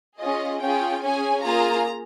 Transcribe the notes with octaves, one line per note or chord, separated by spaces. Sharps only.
C#4 F4 G#4 D#5
C#4 F4 G#4 G5
C#4 G#4 G#5
A#3 F4 G#4 A#5